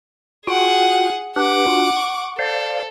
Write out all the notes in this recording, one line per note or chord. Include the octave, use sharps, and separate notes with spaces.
F4 F#4 G#4 F#5 G5
D4 G4 B4 F#5 D6
D4 F4 F#4
C#6
A4 C5 D5 F5